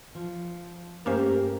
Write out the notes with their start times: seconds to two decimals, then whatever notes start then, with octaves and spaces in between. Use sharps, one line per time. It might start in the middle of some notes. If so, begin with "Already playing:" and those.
0.15 F3
1.06 G2 A3 A#3 C#4 G4 A#4 C5